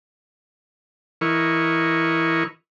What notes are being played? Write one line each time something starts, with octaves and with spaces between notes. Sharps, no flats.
E3 E4 A#4 D#5 C#6